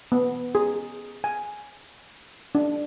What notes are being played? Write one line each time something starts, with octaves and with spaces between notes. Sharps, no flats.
B3
G#4
G#5
D4